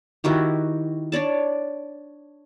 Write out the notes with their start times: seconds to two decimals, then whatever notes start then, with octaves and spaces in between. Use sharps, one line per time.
0.24 D#3 E4 F#4 G4
1.12 D4 C#5 D5 A5